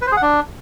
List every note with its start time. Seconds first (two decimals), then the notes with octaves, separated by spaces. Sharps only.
0.02 B4
0.07 C5
0.12 G#4
0.17 F#5
0.22 D4